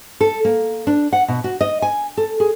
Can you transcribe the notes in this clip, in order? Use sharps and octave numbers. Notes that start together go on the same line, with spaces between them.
A4
A#3
D4
F#5
B2
F#4
D#5
G#5
A4
G#4